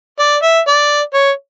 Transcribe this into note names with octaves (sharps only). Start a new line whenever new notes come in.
D5
E5
D5
C#5